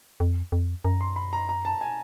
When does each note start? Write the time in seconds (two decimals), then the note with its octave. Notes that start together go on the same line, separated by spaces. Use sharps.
0.20 F2
0.52 F2
0.84 F#2 A#5
1.01 C6
1.16 B5
1.33 A#5
1.49 A#5
1.65 A5
1.81 G#5